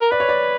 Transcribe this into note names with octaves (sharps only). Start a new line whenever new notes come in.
A#4
B4 D5
C#5
D5